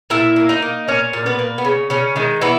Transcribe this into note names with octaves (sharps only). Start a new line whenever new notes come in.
A#2 E4 E5
A#3
D#4 D#5
A#3
A#2 C#4 C#5
A#2
B3 B4
A#3
B3
C#3 C#4
C#3 C#4
D#3 G#3 D#4
E3 B3 E4